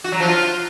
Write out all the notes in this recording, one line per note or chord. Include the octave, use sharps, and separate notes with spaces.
F#4
F#3
F3
F4